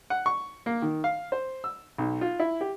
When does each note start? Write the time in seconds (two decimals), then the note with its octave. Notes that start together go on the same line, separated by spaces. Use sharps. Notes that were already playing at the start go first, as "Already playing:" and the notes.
0.10 F#5
0.26 C#6
0.66 A#3
0.82 D#3
1.04 F5
1.32 C5
1.64 E6
1.98 B1
2.21 F4
2.39 E4
2.61 G4